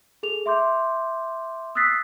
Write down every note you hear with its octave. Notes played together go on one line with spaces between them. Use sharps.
G#4 A4 F7
E5 C6 D6 G6
D#6 E6 F#6 A6 B6 C7